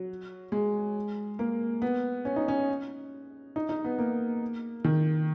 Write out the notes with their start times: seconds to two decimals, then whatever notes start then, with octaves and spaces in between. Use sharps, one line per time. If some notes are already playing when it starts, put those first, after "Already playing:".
Already playing: F#3
0.52 G#3
1.39 A#3
1.82 B3
2.25 C#4
2.36 D#4
2.48 C#4
3.56 D#4
3.69 D#4
3.84 B3
3.99 A#3
4.84 D#3